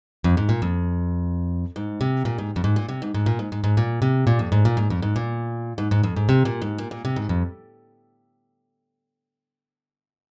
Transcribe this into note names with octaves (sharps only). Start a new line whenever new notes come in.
F2
G#2
A#2
F2
G#2
C3
A#2
G#2
F2
G#2
A#2
C3
G#2
G#2
A#2
G#2
G#2
G#2
A#2
C3
A#2
F2
G#2
A#2
G#2
F2
G#2
A#2
G#2
G#2
F2
G#2
C3
A#2
G#2
A#2
A#2
C3
G#2
F2